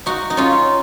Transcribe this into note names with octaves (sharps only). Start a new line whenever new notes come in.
D#4 F#4
D#4
C#4 F4